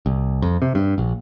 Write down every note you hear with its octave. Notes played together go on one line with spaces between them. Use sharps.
C2
F2
C3
G2
A#1